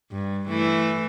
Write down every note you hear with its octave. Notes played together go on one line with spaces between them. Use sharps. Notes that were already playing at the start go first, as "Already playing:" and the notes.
G2
E3 A3